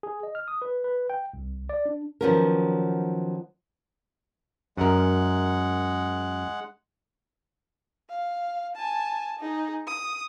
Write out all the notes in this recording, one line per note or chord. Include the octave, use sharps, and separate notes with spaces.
G#4
D#5
F6
D#6
B4
B4
G5
C2
D5
D4
D#3 F3 F#3 B3 C#4 A#4
F#2 G#3 A#4 F#5
F5
G#5 A5
D#4 G#4
D#6